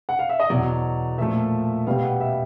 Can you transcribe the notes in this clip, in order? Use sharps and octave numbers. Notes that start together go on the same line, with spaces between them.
F#5
F5
E5
D#5
E2 B2 F#3 D5
A#2 F3 A3 E5
B2 G3 B3 F5
F#5
E5